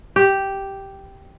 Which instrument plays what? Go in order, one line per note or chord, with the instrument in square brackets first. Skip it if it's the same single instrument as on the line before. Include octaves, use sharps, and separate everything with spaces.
[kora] G4